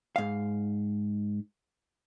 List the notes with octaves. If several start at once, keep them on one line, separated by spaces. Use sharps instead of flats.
G#2 F5